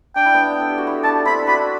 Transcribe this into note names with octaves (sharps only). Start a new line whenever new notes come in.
D4 G5
E4
B3 D4
A4
G4
F#4
E4 G4
D4 F#4 A5
C4 E4 B5
D4 F#4 B5